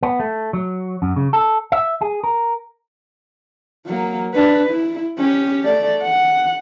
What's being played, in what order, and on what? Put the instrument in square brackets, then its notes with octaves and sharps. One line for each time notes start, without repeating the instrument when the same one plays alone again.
[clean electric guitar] B3
A3
F#3
F#2
C#3
A4
E5
G#4
A#4
[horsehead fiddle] F#3 A#3
D4 B4
E4
C#4 G4
A3 D5
F#5